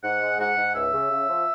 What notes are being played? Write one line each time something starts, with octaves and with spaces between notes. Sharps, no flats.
G#2 F#5
G#3
G#2 F#5
G#2
C#2 E5
C#3
C#3
F3